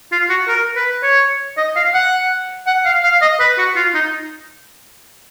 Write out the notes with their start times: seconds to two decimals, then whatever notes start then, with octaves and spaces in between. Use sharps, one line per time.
0.12 F4
0.30 F#4
0.48 A#4
0.76 B4
1.03 C#5
1.57 D#5
1.76 F5
1.94 F#5
2.67 F#5
2.85 F5
3.04 F5
3.22 D#5
3.40 B4
3.58 F#4
3.76 F4
3.94 D#4